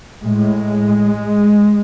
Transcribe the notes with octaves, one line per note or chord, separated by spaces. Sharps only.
A2 G#3